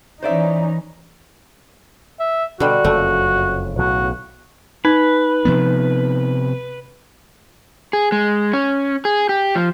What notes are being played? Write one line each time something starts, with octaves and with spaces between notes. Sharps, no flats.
E3 C#4 D#4 C5 D5 E5
E5
B2 D3 G3 F#4
F#1 F2 C#3 A3
B1 A2 C#3 F#4
D#4 B4
C3 F3 B3
G#4
G#3
C#4
G#4
G4
F3